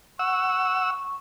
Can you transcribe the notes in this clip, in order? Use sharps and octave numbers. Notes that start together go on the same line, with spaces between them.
F#5 C#6 E6